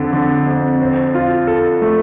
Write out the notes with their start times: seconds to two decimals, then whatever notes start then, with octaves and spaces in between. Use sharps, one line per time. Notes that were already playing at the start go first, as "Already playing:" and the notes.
Already playing: F2 D3
0.13 D3
0.46 F2
0.81 C4
1.14 F4
1.47 A4
1.82 A3